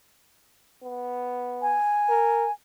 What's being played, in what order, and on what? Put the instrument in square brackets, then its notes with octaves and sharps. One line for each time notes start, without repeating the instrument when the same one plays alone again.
[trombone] B3
[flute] G#5
[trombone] A#4